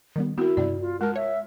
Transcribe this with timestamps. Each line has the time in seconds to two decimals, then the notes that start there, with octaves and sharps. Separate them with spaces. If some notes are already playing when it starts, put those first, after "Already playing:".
0.16 D#3 G3 B3
0.38 B3 C4 E4 F#4 A#4
0.57 G2 C3 D5
0.81 F4
1.01 G#3 A#4 A5
1.16 C#5 E5